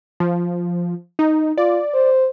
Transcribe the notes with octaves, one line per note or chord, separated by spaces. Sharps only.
F3
D#4
F4 D5
C5